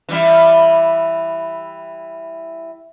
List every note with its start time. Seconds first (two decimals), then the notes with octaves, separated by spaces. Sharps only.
0.09 E3 G3 E4